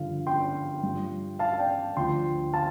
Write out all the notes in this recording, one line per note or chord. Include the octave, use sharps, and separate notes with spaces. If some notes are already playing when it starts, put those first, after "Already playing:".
Already playing: G2 D3 F3 F5
G5 C6
G2 F3
F5 A5
D5 G5
D2 D3 F3 G5 C6
F5 A5